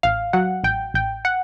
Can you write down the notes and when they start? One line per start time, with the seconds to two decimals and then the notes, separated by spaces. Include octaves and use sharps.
0.03 A1 F5
0.33 F#3 F#5
0.64 A1 G5
0.94 A1 G5
1.25 F#5